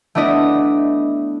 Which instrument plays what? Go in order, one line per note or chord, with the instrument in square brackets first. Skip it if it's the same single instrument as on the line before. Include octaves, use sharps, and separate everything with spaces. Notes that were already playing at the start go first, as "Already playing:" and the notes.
[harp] A3 B3 D4 E4 D#5